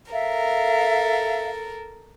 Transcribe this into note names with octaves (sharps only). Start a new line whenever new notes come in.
A4 A#4 E5 F5